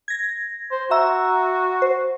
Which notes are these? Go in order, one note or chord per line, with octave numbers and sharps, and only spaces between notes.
G#6 A#6
C5
F#4 E5 A#5 E6
C5